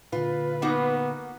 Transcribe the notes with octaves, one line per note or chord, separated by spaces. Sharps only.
A#2 D3 F4 B4
A#3 B3 D#4 F#4